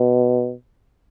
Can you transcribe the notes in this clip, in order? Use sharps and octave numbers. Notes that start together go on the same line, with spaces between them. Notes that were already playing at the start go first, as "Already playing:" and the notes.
Already playing: B2